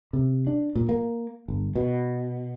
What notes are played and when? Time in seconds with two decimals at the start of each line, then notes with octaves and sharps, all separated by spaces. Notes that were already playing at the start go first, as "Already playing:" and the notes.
0.13 C3
0.47 D4
0.75 A#2
0.89 A#3
1.48 G1
1.75 B2